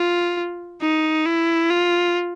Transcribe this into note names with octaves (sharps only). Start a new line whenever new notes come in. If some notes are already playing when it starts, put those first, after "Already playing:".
Already playing: F4
D#4
E4
F4